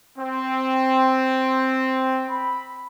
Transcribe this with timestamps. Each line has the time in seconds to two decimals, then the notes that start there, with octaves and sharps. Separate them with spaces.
0.17 C4
2.30 B5